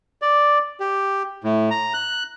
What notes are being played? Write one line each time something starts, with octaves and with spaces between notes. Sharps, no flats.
D5
G4
A2
A#5
F#6